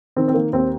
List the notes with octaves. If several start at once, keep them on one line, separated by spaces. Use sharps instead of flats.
D#3 C4
C4
D#3 A#3
D#2 C4